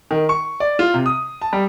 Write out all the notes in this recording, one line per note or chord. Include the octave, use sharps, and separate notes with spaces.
D#3
C#6
D5
F4
C3
D#6
A5
G3